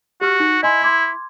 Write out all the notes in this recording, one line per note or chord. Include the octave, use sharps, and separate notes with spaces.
F#4 G4 F6
D#4
E4 D#5 G#5 C6
C6 D6 G#6